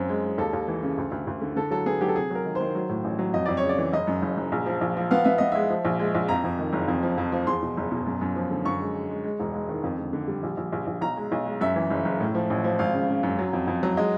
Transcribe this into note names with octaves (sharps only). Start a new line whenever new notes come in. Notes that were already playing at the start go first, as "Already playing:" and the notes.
Already playing: F#2 C4
G#3
G#3
D#2 A4
D#2
E3
C#3
D2
D2
D2
D3
D3 A4
F#3 A4
B3 G#4
F#3 G4
A4
C3 G#4
F#3 A#4
D#3
C5
D#3
F#3
A2
A1
F#3
F2 D#5
F2 D5
C#5
C#3
D5
E3
F#1 D#5
F#2
F#1
F#1
A#1
F3
A#1
F3
B3 F5
B3 E5
B3 D#5
G#3 E5
F3
A#1
G#3
A#1
F2 A#5
F2
D#3
F#1
F2
F3
F2
F3
E2 C6
B2
F#1
B2
F#2
F#2
F3
D3
F#2 C#6
G#3
G#3
G#3
G#3
E1
G#3
D#3
F2
D3
D3
G3
A#1
A#1
A#1
A#1
B1 A#5
G#3
B1
G#3
F#2 E5
E3
F#1
F#1
A2
F3
A1
F3
G#1 F5
C#3
C#3
F#2
F#3
F2
F2
F#3
G#3 D#5